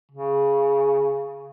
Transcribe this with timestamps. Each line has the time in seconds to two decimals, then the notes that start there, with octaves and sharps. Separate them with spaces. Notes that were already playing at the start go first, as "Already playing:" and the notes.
0.12 C#3